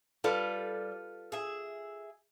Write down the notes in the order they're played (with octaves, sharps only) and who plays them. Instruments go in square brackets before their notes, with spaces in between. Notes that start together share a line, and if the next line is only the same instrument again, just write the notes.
[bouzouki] G3 [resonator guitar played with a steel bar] F4 A4 B4
[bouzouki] G#4 E5